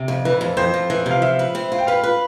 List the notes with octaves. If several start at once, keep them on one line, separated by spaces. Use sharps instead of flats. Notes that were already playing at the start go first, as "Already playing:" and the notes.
Already playing: C3
F2
E3 B4
F2
F2 C5
F2
E3
C3 F5
F3 E5
B4
C4
F4
G5
B4 F5
B4